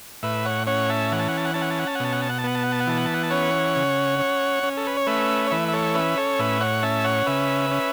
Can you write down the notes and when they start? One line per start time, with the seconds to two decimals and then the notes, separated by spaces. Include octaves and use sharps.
0.23 A2 B4 E5
0.45 C#5 F#5
0.67 C#4 C#5 F#5
0.90 E5 A5
1.12 E3 F#5
1.19 A5
1.28 F#5
1.37 A5
1.45 F#5
1.54 C#4 A5
1.61 F#5
1.70 A5
1.79 F#5
1.87 A5
1.95 F#5
2.00 B2 A5
2.12 F#5
2.22 A5
2.29 F#5
2.38 A5
2.44 B3 F#5
2.55 A5
2.63 F#5
2.72 A5
2.80 F#5
2.87 E3 A5
2.98 F#5
3.05 A5
3.14 F#5
3.23 A5
3.30 C#4 C#5 F#5
3.76 C#3
4.19 C#4
4.63 C#4
4.77 A4
4.87 B4
4.97 C#5
5.07 A3 B4 E5
5.47 C#5
5.51 E3 B4 E5
5.68 E5
5.73 A4 C#5
5.95 C#4 B4 E5
6.17 A4 C#5
6.39 A2 B4 E5
6.60 C#5 F#5
6.83 C#4 E5 A5
7.04 C#5 F#5
7.26 C#3 B4 E5
7.71 C#4